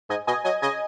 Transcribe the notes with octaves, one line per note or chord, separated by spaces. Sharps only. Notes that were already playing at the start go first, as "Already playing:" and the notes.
G#2 D#5 G#5
B2 D#5 G#5
F#3 D#5 G#5
C#3 D#5 G#5